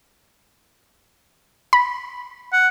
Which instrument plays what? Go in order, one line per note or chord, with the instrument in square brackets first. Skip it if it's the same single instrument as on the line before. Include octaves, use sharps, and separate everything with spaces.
[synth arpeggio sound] B5
[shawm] F#5